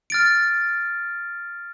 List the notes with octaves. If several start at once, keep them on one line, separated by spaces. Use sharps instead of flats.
F6 A6 D7